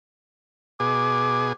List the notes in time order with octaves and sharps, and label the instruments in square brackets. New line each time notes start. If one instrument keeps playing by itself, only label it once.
[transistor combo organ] B2 G#4 [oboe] D6